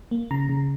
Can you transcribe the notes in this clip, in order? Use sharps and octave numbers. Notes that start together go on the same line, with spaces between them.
A#3
C#3 A#5
C#3